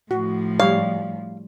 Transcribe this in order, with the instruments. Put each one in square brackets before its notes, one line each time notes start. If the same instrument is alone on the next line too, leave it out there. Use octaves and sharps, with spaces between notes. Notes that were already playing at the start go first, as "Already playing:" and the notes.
[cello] A2 F3 [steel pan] F#4
[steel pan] G3 C#5 [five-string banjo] F5